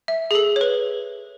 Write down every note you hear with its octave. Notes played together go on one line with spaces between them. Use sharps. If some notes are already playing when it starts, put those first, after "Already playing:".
E5
G#4
A4
C#5
B4